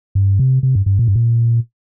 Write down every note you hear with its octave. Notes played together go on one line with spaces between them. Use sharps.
G2
C3
C3
G2
G2
A#2
G2
A#2